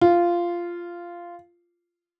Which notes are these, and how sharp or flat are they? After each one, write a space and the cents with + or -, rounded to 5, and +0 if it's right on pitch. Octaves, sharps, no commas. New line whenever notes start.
F4 -10